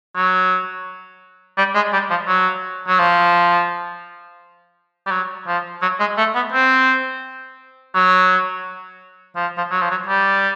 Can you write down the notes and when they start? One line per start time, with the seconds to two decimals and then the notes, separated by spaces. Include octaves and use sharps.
0.16 F#3
1.58 G3
1.75 G#3
1.93 G3
2.10 F3
2.27 F#3
2.88 F#3
2.99 F3
5.06 G3
5.11 F#3
5.47 F3
5.82 F#3
6.00 G#3
6.17 A3
6.35 B3
6.52 C4
7.95 F#3
9.36 F3
9.57 F3
9.71 F#3
9.81 F3
9.90 F#3
10.06 G3